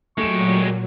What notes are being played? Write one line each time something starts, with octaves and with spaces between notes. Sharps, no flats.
A#2 F#3 G#3 A3 G4 C#6 E7